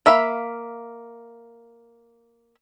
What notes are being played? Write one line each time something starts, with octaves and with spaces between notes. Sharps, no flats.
A#3 E5 F5 B5